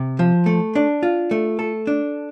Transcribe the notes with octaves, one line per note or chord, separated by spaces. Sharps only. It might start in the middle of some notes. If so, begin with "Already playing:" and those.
Already playing: C3
F3
A3
D4
F4
A3
A4
D4